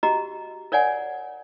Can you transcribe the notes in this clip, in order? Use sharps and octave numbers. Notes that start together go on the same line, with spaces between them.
F#4 G4 D#5 A#5
A#4 C#5 D5 F#5 G#5